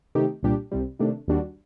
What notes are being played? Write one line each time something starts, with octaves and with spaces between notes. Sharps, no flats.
C3 D#3 A3 D#4 G4
C2 A#2 G3 D4 G4
C2 C3 G3
C3 D#3 A3 D4
D#2 D#3 G3 D4 F#4